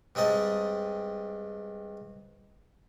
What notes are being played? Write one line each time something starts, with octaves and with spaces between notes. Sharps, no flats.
G2 G#3 C4 D#5 A5